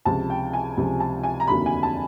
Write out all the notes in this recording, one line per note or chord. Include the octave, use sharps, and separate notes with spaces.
C#2 C3 F3 A5
G5
G#5
C#2 C3 F3
A5
G#5
A#5
F1 D#2 D3 F#3 B5
G#5
A5